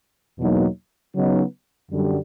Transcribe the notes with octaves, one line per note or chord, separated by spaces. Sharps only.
E2 B2 F#3 A#3 D#4
C#3 F#3 B3 D#4
F#2 D3 G3